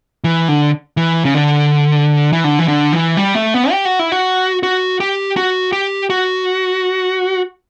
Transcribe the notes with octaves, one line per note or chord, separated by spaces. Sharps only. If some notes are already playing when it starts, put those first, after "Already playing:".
E3
D3
E3
C#3
D3
E3
D3
E3
D3
E3
G3
A3
B3
G4
F#4
E4
F#4
F#4
G4
F#4
G4
F#4